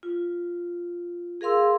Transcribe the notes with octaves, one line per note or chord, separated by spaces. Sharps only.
F4
G#4 A#4 F5 C6 E6